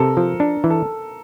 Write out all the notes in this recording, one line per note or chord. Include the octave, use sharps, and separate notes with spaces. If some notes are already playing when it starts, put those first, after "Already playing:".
Already playing: C3 A4 A#4
F3
D4
E3
A4